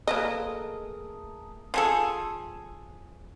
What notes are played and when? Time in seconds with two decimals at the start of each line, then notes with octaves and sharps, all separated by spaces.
0.07 A3 A#3 G#4 A#4 B4 D#5
1.74 F3 G#4 A4